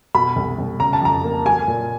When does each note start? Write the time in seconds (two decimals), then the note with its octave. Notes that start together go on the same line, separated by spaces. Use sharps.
0.15 B2 B5
0.36 C2
0.58 C2
0.80 C#3 A#5
0.93 A5
1.02 F2 A#5
1.24 A#3
1.46 F#3 G#5
1.68 A#2